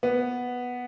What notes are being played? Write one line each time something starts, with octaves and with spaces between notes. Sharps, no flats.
B3